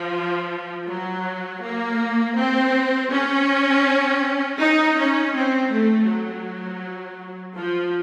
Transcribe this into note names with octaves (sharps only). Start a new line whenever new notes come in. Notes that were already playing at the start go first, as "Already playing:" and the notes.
Already playing: F3
F#3
A#3
C4
C#4
D#4
C#4
C4
A3
F#3
F3